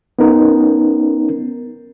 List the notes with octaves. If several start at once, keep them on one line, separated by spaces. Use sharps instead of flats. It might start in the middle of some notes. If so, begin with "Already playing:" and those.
B3 C#4 D#4 A#4